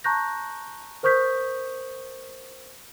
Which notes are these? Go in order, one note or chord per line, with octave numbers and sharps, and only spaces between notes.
A5 A#5 C#6 F#6 G6 A#6
A#4 C5 C#6 D#6 G6 B6